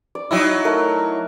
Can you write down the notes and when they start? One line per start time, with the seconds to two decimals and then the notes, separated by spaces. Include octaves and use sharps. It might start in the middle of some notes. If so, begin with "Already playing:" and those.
0.15 D5
0.31 F#3 D#4 E4
0.65 A3 A#4